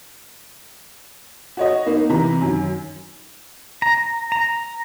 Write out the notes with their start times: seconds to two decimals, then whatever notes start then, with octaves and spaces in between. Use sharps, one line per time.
1.57 F#4 C#5 D#5
1.86 A#3 B3 D#4
2.09 C3 E3 A#5
2.41 F#2 D#3
3.82 A#5
4.32 A#5